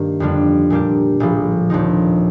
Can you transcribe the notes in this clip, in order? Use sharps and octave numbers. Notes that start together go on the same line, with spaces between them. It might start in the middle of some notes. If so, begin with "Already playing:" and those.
Already playing: G2 D#3 A#3
F2 D3 G3 D4
A#2 G3 A#3 D4 G4
A#1 A2 F3
D#2 D3 F3 C4 D#4